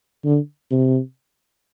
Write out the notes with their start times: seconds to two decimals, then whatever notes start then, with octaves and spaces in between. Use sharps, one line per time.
0.25 D3
0.71 C3